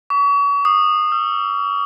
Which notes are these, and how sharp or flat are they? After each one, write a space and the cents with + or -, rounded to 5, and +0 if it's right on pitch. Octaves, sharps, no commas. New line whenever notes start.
C#6 +40
D#6 -20
E6 +35